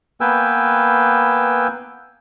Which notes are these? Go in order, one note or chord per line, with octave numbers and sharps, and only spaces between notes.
A#3 B3 B4 G5 G#5 E6